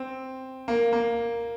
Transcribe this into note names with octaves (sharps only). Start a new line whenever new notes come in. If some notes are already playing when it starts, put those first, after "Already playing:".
Already playing: C4
A#3
A#3